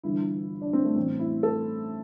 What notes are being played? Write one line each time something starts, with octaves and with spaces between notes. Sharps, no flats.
G1 G2 E3 E4
D4
C4
A3
A1 A2 E3 C4
E4
A4